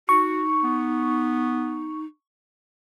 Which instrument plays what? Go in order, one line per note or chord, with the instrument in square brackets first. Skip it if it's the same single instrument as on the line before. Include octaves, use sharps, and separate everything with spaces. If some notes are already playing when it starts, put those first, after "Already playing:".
[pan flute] D#4 [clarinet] F#4 [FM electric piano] C#6
[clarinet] B3